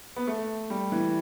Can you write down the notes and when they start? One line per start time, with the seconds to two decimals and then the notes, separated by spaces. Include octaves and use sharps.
0.16 B3
0.27 A3
0.70 G3
0.92 E3